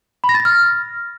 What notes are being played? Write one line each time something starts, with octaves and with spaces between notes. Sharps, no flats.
B5
A#6
A6
A#6
F6